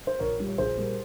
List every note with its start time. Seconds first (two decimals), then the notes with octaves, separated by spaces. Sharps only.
0.07 C5
0.19 A#1 A#4 C#5
0.38 A#2 G3 A#3
0.48 C#5
0.58 A#1 G#4 C5
0.77 A#2 G3 A#3